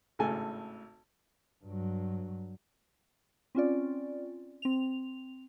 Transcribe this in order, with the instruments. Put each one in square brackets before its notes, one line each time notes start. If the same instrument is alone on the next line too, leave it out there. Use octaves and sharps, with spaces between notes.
[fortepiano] G#1 A2 C#3 A4 G#5
[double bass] G2 F#3
[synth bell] C4 C#4 F4 D5
C4 F7